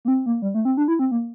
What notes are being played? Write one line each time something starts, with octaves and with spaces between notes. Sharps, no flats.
A#3
C4
A#3
G3
A3
C4
D4
E4
C4
A#3